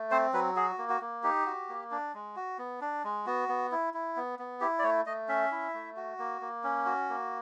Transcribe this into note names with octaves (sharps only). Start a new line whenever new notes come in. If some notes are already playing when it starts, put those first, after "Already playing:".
Already playing: A3
C4 C5
F#3 B4
F#4 G#4
A#3
F#4
A#3
D#4 G4
F#4
A#3
D4
G#3
F#4
B3
D4
G#3
B3 F#4
B3
E4
E4
B3
B3
E4 G4
D5
A3 C#5
A3 D#5
C#4 E5
E4
A3
F#4
A#3
A#3
C#4
F#4
A#3